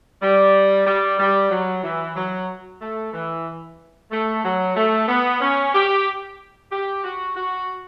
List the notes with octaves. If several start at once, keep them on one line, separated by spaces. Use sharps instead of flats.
G3
G3
G3
F#3
E3
F#3
A3
E3
A3
F#3
A3
B3
C#4
G4
G4
F#4
F#4